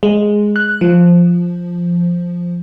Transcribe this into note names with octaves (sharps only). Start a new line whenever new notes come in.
G#3
F#6
F3